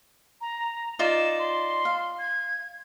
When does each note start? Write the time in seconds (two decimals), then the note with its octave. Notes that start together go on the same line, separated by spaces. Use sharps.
0.41 A#5
0.99 D#4 F4 D5 E7
1.38 C6
1.85 F5
2.19 G#6